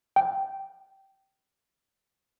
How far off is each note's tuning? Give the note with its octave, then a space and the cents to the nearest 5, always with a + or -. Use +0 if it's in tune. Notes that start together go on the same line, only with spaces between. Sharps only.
G5 -15